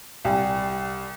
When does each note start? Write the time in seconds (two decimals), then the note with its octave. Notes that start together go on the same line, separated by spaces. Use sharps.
0.25 C2 D5 G5 G#5